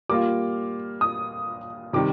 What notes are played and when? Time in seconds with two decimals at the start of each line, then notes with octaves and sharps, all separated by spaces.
0.09 G3 A#3 F4 D6
1.01 D#6
1.93 C3 D#3 G3 D6